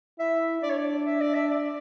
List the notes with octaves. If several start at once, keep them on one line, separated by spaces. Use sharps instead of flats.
E4 E5
D4 D5
C#5
D5
E5
D5
E5
D5